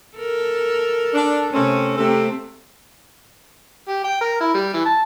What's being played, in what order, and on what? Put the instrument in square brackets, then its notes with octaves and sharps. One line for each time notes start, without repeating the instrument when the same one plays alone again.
[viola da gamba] A4 A#4
[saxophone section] D4
[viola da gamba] C3 [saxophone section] A3 C4 C#4
[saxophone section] C3 A4 [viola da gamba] A3 C4
[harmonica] G4
G5
A#4
E4
G3
E3
A5